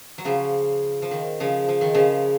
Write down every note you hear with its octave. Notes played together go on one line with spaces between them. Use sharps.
F#3
C#3 F3
F3
D#3
C#3 F3
F3
D#3
C#3 F3